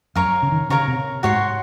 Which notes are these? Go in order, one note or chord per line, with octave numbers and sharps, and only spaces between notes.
F#2 A#4 C#5 F5 A#5
C#3
D#3
C#3 A#4 C#5 F5 A#5
C3
G#2 F#4 C#5 F#5 C6